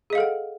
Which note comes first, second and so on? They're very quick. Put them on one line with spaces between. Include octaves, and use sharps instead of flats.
G#4 D#5 F5 A4 F#5